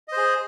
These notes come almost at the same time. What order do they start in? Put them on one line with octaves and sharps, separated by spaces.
D#5 C5 G#4